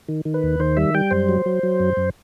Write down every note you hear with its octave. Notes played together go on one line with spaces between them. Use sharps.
D#3
D#3
B4
D#2
D#3 C5
G3 E5
G3 G5
F#2 C5
F#3
F#3
F#3
F#2
F#2